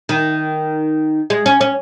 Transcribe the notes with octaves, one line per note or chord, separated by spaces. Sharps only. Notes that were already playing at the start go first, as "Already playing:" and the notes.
D#3
G#3
C#4
C#4